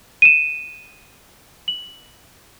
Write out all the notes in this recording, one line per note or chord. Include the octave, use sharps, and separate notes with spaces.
D#7 E7
F#7